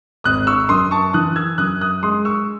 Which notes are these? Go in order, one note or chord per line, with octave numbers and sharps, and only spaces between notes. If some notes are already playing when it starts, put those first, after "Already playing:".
G#1 D#6 F#6
C#6 E6
F#2 C6 D#6
A5 C#6
E3 D#6 F#6
E6 G#6
F#2 D#6 F#6
D#6 F#6
G#3 C6 D#6
C#6 E6